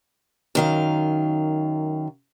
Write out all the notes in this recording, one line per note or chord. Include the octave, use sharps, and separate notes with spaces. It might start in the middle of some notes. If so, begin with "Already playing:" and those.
F#2 D#3 F5